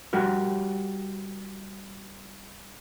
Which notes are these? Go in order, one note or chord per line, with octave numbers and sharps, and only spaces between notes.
G3 F#4 G4 A#4